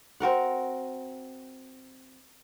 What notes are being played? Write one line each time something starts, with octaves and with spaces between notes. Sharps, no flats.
C4 F#4 A#4 F#5